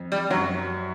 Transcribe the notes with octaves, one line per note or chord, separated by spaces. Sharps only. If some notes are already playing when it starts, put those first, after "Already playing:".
Already playing: F2
G3
F#2 F#3